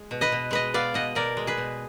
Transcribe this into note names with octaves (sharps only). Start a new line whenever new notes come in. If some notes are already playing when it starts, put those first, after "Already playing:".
Already playing: G#3
B2
B4 D#5
B2
G#3 B4 D#5
B3 D5 F5
B2 D#5 F#5
B2 A#4 D5
G#3
G#4 B4
B2